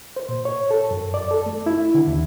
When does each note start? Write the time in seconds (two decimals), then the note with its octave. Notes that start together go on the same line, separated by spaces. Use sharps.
0.16 C5
0.29 A#2
0.45 C#5
0.71 A4
0.91 F#2
1.14 D5
1.31 A4
1.46 A3
1.66 E4
1.94 D3
2.07 D#2